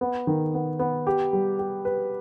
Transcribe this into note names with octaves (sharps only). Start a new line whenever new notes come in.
B3
D#3
B3
B3
G4
G3
G4
B4